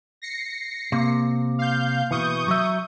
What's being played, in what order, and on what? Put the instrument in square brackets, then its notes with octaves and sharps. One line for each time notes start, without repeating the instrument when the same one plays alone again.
[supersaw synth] A#6 C7 C#7
[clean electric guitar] C3 [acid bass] A#3
[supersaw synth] F5 G6
[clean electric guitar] B2 E3 [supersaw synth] C#6 D#6 G6
[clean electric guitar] F#3 E5